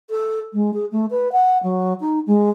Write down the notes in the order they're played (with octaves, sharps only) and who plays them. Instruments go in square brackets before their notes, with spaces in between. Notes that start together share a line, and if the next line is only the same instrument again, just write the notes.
[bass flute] A4
G#3
G#4
A3
B4
F#5
F#3
D#4
G#3